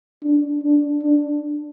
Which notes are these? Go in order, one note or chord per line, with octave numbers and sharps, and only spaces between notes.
D4
D4
D4